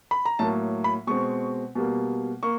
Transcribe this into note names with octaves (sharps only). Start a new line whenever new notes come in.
B5
A#5
A2 F#3 A#3 A5
B5
B2 G#3 C4 C#6
B2 G3 A#3
A#3 C#6